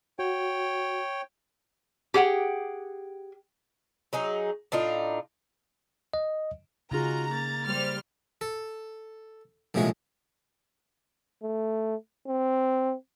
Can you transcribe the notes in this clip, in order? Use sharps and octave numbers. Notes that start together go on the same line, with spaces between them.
F#4 C#5 G5
G4 G#4 F#5 G5
F#3 D#4 G#4
A2 D4 D#4 F4
D#5
C#3 D#4 F4 F#4 G#4 A#5
A#3 A6
G3 C5 F6
A4
A#1 A2 C3 F3 G#3 F#4
A3
C4